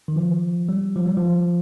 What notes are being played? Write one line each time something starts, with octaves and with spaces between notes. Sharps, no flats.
D#3
F3
G3
F3
G3
F3